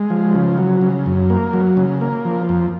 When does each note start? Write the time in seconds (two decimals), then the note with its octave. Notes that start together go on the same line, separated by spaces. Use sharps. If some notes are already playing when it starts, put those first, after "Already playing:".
Already playing: G#3
0.10 F3
0.35 C#3
0.58 F#3
0.82 C#3
1.06 F#2
1.30 A#3
1.53 F#3
1.77 C#3
2.01 A#3
2.25 F3
2.49 F2